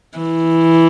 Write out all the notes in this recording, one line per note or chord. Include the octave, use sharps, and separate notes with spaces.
E3